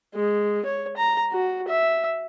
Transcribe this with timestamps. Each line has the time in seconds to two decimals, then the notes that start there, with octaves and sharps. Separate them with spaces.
0.15 G#3
0.65 C#5
0.97 A#5
1.32 F#4
1.68 E5